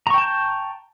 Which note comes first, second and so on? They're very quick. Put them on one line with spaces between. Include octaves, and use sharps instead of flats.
A#5 C#6 G5 A5 G6